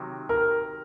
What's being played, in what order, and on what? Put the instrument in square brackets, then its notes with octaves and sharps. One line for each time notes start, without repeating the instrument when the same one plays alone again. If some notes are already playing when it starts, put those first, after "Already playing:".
Already playing: [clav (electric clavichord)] C3 D#3 F#3
[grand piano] A#4